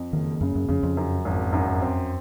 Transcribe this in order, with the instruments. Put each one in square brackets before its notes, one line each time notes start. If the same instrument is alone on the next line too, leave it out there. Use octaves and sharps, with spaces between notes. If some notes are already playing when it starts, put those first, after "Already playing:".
Already playing: [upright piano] F2
[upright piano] F#1 [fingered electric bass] D#3
[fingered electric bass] F#2 [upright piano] C#3
[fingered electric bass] F#2
[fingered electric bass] F2 [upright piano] C#3
[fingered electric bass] F2
[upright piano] F#2
G#1
F#2
C4